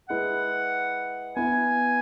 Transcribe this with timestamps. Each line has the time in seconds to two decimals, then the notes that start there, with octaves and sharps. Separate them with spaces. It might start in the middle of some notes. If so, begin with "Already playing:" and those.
0.09 G#3 E4 B4 F#5
1.36 B3 E4 B4 G#5